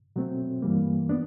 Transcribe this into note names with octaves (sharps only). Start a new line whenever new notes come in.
B2 F#3 A3 C4
G2 E3 G3 A#3
B3 D4